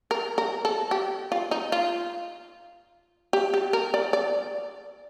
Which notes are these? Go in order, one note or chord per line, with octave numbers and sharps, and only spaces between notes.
A#4
A#4
A4
G4
F4
D#4
F4
G4
G4
A#4
D5
D5